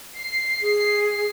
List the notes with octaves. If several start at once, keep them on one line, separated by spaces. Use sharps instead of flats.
C7
G#4